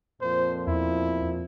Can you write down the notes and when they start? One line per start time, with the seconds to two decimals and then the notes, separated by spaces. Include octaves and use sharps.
0.21 F2 A#2 F3 C5
0.67 E2 E4